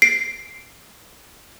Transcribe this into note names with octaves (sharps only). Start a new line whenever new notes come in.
C7 D7